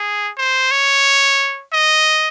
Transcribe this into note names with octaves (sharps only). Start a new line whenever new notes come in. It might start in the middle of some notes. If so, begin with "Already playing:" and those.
Already playing: G#4
C5
C#5
D#5